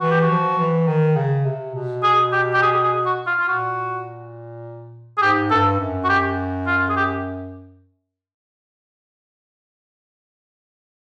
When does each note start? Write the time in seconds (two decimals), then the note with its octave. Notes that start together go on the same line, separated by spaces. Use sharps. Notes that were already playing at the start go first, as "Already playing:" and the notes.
0.01 E3 F#4
0.11 G4
0.21 F#4
0.30 F3
0.58 E3
0.87 D#3
1.16 C#3
1.45 C3
1.75 B2
2.03 G#4
2.33 G4
2.54 G4
2.62 G#4
2.84 G#4
3.06 F#4
3.27 F4
3.40 F4
3.48 A#2 F#4
5.18 G#4
5.22 G#2 G4
5.51 G2 A4
5.80 F#2
6.04 F#4
6.10 G4
6.67 F4
6.90 G#4
6.97 G4